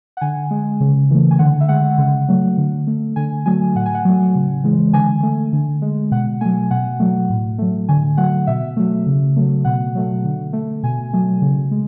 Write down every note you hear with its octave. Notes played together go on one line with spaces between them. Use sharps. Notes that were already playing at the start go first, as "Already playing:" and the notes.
F#5
D3 G#5
G#3
C#3
E3 A3
G#5
D3 F#5
E5
G#3 F#5
C#3
F#3 A3
D3
A3
D3 G#5
F#3 A3 G#5
A2 F#5
G#5
F#5
F#3 A3
C#3
E3 G#3
D3 G#5
A3
D3
G#3
B2 F#5
F#3 A3 G#5
B2 F#5
F#3 A3
A2
F#3 A3
D3 G#5
F#3 A3 F#5
B2 E5
F#3 A3
C#3
F#3 A3
B2 F#5
F#3 A3
D3
A3
B2 G#5
F#3 A3
C#3
G#3